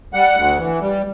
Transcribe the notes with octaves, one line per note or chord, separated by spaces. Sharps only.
G3 F#5
D2
E3
G3